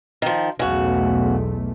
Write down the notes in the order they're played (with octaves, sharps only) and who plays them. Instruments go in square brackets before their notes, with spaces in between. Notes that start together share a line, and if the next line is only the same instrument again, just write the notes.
[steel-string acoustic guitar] D#3 F3
[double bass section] B1 E2 A3 [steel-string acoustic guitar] C#3 F#4